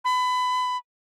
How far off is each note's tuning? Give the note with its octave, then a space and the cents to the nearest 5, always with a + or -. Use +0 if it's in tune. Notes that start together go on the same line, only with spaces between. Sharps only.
B5 +25